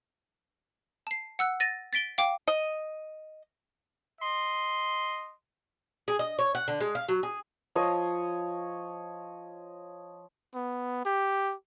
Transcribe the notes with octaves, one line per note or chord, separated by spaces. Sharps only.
A5 C7
F#5 E6 F#6
A6 A#6 D#7
A6 B6 D7 G7
F5 G5 D6
D#5
D#5 C6
G#4
D#5
C#5
F#5
D3
G#3
F5
F#3
G#4
F3 C#5 D#5
B3
G4